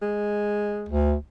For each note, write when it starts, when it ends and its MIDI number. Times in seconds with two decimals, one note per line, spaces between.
0.02 0.96 56
0.89 1.13 38